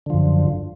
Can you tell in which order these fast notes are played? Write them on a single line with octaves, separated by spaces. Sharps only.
D3 F3 F#2